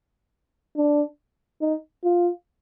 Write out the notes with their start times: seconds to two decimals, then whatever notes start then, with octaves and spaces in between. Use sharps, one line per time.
0.77 D4
1.61 D#4
2.04 F4